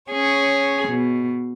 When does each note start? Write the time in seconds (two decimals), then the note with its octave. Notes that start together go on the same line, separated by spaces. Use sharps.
0.11 C#4 G#4 C#5
0.87 B2